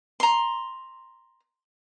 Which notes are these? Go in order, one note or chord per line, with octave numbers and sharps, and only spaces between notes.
A#5 C6